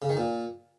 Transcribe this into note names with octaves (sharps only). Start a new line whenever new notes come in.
C#3
D#3
A#2